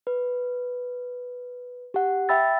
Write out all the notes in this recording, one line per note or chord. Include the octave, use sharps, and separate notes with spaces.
B4
G4 F#5
E5 G5 B5 E6 A6